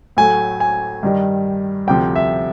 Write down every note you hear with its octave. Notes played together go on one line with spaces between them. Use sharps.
A2 F#3 A3 G#5
G#5
G2 D#3 G3
D2 C3 F3 G5
E5